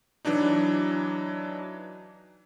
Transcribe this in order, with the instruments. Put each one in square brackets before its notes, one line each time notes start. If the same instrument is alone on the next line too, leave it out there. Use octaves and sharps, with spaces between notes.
[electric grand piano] E3 F#3 D4 D#4